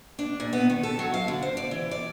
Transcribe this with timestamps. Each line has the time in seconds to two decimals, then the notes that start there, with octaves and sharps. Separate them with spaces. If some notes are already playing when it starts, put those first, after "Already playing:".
0.19 D4
0.40 A#2
0.53 B3
0.70 D#3
0.83 A4
0.99 F#3
1.14 F5
1.28 D3
1.42 C5
1.57 D5
1.71 E3
1.91 D5